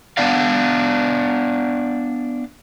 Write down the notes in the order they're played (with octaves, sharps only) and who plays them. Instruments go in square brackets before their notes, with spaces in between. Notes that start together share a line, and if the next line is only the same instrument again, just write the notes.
[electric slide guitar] B3 D4 D5 F5